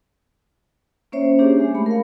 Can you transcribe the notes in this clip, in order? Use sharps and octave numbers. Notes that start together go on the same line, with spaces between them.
A#3 C#4 C5 C#5 E5
A#3 D4 G4 G#4
G#3
A3 B5
A#4 F5